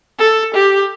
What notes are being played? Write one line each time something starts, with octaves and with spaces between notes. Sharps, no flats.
A4
G4